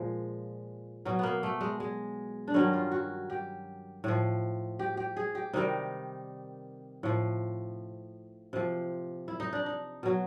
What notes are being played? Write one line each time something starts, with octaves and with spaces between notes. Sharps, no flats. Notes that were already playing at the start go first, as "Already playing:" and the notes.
Already playing: A#2 F3 G#3
B2 F#3
A#3 B3
A3
G#3
G#3
D4
G2 D#3 F#3 C#4
F4
F#4
G4
A2 F3
G4
G4
G#4
G4
C3 D#3 G3 D#4
A2 F3
C3 F3
E4
D#4
D4
D#4
B2 F#3